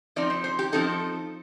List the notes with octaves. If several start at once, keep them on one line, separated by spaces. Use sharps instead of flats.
F3 C4 D#4 D5
C5
C5
G4
F3 C4 D#4 A4